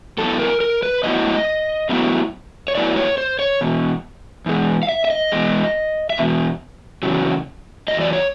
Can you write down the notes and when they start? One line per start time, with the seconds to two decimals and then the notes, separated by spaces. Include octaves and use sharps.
0.18 A2 F#3 B3 E4 A4
0.39 A#4
0.60 A#4
0.83 B4
1.04 A2 F#3 B3 E4 D#5
1.89 A2 F#3 B3 E4
2.68 C#5
2.75 A2 F#3 B3 E4 D5
2.96 C#5
3.18 C5
3.39 C#5
3.61 E2 B2
4.46 E2 B2 G#3
4.83 F5
4.89 E5
5.05 E5
5.10 D#5
5.32 E2 B2 G#3
6.10 E5
6.17 E2 B2
7.03 E2 C#3 F#3
7.88 E2 C#3 F#3 D#5
8.01 D5
8.13 C#5